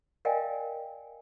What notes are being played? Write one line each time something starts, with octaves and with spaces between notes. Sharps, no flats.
A#4 D5 D#5 F5 G5 G#5